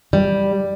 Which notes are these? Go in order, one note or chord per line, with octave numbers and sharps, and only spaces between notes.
G3